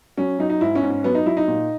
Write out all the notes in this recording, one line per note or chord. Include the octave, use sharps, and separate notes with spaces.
F#3 C#4
F#3 D#4
D#4
G#2 E4
C#4
G#2
C#4
F#3 B3
D#4
F#3 E4
D#4
A#2